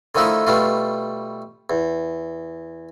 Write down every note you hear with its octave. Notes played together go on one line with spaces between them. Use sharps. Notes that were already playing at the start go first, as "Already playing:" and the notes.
D3 D#3 F3 A3 D#4 E4
B2 G3 A3 F4
E2